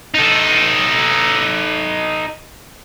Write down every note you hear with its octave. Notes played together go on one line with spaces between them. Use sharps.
D#4 A4